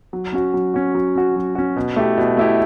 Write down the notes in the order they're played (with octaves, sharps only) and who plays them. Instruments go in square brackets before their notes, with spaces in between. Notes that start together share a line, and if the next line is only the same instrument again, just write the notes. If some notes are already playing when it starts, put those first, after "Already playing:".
[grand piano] F#3
C#4 F#4
F#3
C#4 F#4
F#3
C#4 F#4
F#3
C#4 F#4
B2
A3 E4 G4
B2
A3 E4 G4